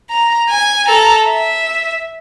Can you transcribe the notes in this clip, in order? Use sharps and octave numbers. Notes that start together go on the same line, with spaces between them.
A#5
G#5
A4 A#5
E5